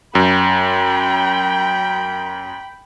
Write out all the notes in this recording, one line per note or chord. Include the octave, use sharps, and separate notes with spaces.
F#2 G5 B5